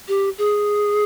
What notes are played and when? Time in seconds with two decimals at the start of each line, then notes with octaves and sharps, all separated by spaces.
0.08 G4
0.38 G#4